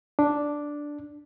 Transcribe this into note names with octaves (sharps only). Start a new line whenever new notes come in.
D4